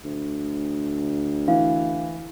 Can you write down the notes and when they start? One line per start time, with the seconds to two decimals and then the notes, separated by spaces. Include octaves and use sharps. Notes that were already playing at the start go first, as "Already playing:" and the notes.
0.04 D2
1.48 E3 F5